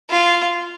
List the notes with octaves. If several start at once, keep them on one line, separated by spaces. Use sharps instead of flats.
F4